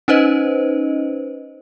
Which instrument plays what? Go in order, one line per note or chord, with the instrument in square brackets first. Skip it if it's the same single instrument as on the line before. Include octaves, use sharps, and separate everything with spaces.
[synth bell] C#4 D#4 B4 C5 D#5